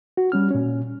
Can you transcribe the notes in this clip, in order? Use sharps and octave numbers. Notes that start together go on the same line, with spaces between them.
F#4
G3 C#4 F6
A#2 C#4